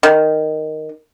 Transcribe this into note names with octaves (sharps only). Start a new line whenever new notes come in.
D#3